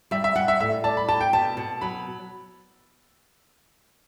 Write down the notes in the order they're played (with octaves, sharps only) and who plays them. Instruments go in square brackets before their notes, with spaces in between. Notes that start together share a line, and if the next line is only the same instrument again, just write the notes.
[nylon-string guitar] G3 [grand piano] E5
[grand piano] E5
[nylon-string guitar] G3 [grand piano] F#5
[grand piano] E5
[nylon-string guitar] A2 [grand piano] E5
[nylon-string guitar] D5 [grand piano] A5
[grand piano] B5
[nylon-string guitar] G4 [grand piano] A5
[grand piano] G5
[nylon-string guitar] B2 [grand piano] A5
[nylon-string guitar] B2
[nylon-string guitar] F#3 [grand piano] B5